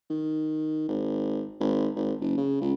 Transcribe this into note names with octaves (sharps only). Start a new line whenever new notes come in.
D#3
G#1
G#1
G#1
F#1
C#3
C#2